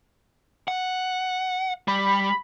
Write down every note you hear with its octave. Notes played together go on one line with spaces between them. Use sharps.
F#5
G3 B5